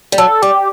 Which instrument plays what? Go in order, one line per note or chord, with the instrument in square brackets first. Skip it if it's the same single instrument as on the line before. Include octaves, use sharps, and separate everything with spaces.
[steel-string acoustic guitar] G3
[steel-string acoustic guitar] F#3 [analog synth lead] A4
[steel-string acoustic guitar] G3 [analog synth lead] G4